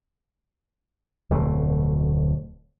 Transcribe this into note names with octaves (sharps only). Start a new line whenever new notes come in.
D1 F2 B2 A3